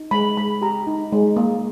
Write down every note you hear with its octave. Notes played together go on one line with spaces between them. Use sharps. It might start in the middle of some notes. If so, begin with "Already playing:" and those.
Already playing: D#4
G#3 B5
G#3 B5
G4 A#5
D#4
G#3
A#3